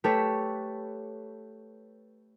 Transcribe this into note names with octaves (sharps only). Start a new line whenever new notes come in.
A3 G4 A4 B4 C#5